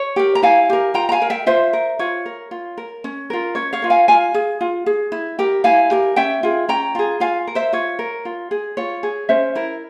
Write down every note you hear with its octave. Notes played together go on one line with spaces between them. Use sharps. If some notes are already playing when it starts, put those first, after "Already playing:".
Already playing: C#5
G4 A#4
A#5
E4 F5 G#5
G4 A#4
F4 G5 A#5
A#5
F5 G#5
A#4
E5 G5
F4 C5 E5
A#4
F4 C#5
A#4
F4
A#4
C#4
F4 A#4
C#4 C#5
C#5 F5
F4 A#4
F5 G#5
F4 F5 G#5
G#4
F4
G#4
E4
G4 A#4
E4 F5 G#5
G4 A#4
C#4 E5 G5
F4 G#4
C#4 G5 A#5
F4 G#4
F4 F5 G#5
A#4
C5 E5
F4 C#5
A#4
F4
G#4
F4 C#5
G#4
C#4 C5 E5
E4 A#4